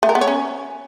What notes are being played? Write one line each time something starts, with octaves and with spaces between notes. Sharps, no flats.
A3
A#4
B3
C#5
C#4